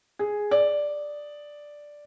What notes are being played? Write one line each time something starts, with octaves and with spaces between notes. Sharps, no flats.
G#4
D5